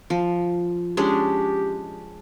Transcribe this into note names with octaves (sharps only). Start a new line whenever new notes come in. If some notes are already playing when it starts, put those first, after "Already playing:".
F3
G#3 C#4 D4 G4